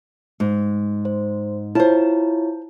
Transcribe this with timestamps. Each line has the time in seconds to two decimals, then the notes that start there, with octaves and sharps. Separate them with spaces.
0.40 G#2
1.05 C5
1.75 E4 F4 C5 C#5 A5